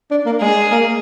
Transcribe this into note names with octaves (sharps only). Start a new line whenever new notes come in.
D4
A#3
G#3 G#4
A#3